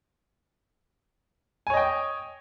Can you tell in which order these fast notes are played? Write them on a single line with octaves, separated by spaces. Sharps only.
G#5 C#5 D#5 G5